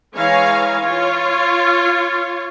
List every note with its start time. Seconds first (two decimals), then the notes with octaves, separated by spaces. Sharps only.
0.16 E3 G#3 C#5 F5 G#5 A#5
0.82 F4 C#5